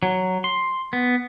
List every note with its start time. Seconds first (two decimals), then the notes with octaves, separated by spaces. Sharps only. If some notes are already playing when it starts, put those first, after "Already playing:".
0.03 F#3
0.44 C6
0.93 B3